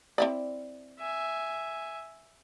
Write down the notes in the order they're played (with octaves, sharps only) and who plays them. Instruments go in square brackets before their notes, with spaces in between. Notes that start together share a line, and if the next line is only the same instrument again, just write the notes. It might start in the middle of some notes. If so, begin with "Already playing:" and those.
[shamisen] C4 E4 D5
[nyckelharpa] E5 G#5